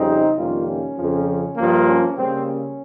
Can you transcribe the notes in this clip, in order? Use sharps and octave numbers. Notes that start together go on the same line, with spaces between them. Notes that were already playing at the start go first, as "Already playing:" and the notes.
Already playing: F2 C#3 G3 C4 D#4
F2 C3 D#3 G3 A#3 C#4 F4
C#4
F2 C#3 F3
G2 F3 A#3
C#4
C#3 G3 A#3 C4
C#4